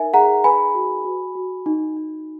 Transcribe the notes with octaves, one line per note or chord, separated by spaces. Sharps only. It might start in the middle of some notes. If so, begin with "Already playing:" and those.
Already playing: D#4 A#4 E5 G#5
G#4 F#5 A#5
B4 G#5 B5
F#4
F#4
F#4
D#4
D#4